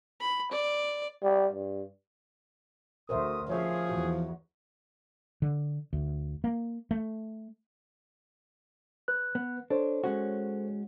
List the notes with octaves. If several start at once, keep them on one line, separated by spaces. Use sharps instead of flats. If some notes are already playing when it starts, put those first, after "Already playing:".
B5
D5
G3
G2
D2 A3 A#4 C5 E5 D#6
C#3 F3 G#4 C#5 E5 F5
E2 F#4
D3
D2
A#3
A3
B4 F#6
B3
D4 A4 C5 C#5
G#3 C#4 F#4